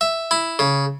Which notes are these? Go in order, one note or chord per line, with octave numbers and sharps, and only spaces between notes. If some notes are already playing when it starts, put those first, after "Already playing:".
E5
E4
C#3